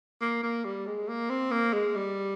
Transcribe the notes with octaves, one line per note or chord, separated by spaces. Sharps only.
A#3
A#3
G3
G#3
A#3
C4
A#3
G#3
G3